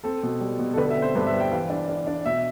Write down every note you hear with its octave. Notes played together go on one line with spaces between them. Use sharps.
C4 A4
B2
G3
B2
A4
D3 B4
E5
C4
C5
G2 B4
E5
G3
G5
E3 F5
D4
D4
D4
B2 E5